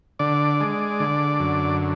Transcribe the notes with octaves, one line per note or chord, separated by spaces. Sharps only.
D3 D5
G#3
D3
F#2